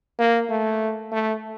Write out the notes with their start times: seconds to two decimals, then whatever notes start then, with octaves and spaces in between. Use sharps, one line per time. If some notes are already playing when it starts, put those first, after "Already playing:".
0.19 A#3
0.50 A3
1.12 A3